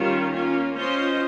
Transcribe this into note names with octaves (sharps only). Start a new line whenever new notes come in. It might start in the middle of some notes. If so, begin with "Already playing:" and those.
Already playing: D#3 G3 C#4 F4
A#3 C#4 F4
C#4 F4 C5 D#5